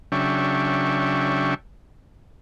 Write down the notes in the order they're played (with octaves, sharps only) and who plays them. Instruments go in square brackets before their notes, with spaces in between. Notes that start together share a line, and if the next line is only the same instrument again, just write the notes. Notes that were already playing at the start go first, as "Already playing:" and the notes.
[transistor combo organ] C#3 F#3 D4 E5 G5 C#6